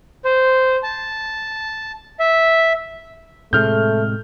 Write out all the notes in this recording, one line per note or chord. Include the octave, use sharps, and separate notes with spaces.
C5
A5
E5
A2 C3 G#3 A3 F6 G6